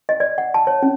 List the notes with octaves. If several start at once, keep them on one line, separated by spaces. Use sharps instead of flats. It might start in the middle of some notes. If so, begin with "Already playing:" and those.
D#5
D5
F#5
A5
C#5
C#4